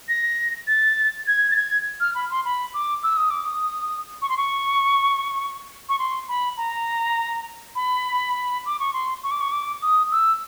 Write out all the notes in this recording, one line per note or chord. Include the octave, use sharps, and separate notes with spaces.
A#6
A6
G#6
A6
G#6
F6
B5
C6
B5
D6
E6
D#6
D6
D#6
C#6
C6
C#6
C#6
C6
B5
A#5
B5
D6
C#6
C6
C#6
D6
C#6
D6
D#6
E6